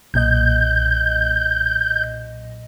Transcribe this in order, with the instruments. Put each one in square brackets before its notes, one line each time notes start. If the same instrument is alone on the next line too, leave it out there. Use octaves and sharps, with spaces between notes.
[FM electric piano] B1 A#2 D#5 [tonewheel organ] G6